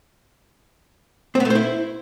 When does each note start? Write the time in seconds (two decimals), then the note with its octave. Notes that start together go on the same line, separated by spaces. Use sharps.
1.35 C4
1.40 B3
1.45 A3
1.50 C5
1.55 E4